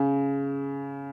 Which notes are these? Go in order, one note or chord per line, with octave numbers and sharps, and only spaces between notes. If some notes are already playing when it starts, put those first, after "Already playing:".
Already playing: C#3